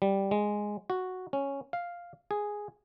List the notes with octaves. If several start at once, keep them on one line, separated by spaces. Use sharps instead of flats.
G3
G#3
F#4
C#4
F5
G#4